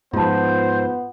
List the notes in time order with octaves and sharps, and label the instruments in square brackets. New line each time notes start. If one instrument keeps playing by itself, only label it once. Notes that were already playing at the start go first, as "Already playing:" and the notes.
[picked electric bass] G#2 F3 [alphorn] B3 [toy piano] F4 A5 [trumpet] C5